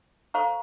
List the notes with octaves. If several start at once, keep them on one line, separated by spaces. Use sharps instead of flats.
A4 C5 F5 A#5 C#6